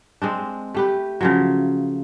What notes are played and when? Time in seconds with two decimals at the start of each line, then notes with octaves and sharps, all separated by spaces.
0.22 G#3 C4 D4
0.75 A3 G4 B4
1.21 C#3 F3 F#3